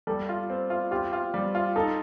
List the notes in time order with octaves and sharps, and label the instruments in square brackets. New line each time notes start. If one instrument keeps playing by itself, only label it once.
[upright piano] G3 [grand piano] A4
[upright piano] F4
C4
F4
[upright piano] F4 [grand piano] G4
[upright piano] F4
G3
F4
[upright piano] D#4 [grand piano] A4